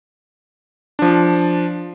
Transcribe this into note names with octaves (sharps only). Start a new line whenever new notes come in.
F3 D4